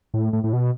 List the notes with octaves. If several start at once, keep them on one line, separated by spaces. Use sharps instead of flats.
A2
A2
A2
B2